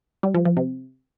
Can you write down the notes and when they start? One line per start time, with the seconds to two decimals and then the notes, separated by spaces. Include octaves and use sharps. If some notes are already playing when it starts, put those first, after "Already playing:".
0.23 G3
0.34 F3
0.45 F3
0.57 C3